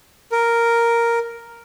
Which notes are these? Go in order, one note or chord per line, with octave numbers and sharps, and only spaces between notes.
A#4